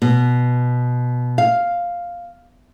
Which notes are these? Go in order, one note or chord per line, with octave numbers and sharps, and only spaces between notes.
B2
F5